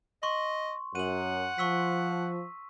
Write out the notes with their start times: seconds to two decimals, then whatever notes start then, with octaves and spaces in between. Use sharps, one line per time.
0.23 D#5 C6 C#6
0.95 F#2 F#5 D#7 F#7
1.58 F3 C#6 E6 B6